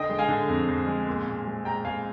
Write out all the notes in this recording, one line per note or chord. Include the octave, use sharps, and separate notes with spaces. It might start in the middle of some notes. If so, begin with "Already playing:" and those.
Already playing: D3 D#5 G5
G#3
F5 G#5
D3
F2
F2
G#3
A#2
A#2
G#3
G#3 G5 A#5
G#3 F5 G#5